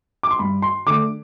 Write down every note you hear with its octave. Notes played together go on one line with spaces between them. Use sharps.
D6
C6
G2 B5
C6
D3 A3 D6